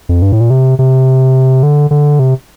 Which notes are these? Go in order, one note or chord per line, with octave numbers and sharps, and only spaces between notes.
F2
G2
A2
A#2
C3
C3
D3
D3
C3